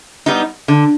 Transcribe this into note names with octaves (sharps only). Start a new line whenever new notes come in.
G3 B3 D#4
D3